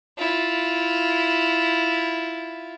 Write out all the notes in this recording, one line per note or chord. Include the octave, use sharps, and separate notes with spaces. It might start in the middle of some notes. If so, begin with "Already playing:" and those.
E4 F4